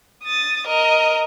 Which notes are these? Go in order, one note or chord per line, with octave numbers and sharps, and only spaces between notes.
D#6 A6
A#4 D#5